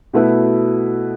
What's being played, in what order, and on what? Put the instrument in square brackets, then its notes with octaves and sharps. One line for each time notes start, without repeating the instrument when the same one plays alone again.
[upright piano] B2 A3 E4 B4